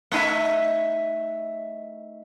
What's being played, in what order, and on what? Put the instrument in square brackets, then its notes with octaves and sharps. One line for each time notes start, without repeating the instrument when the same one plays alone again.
[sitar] A3 D#4 E5